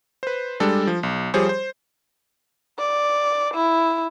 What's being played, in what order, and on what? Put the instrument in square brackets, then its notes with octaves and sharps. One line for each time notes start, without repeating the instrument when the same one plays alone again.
[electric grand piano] B4 C5
G3 G#3 D4 A4
F3
B1
F3 G3 G4 G#4 C5 C#5
C5
[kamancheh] D5
E4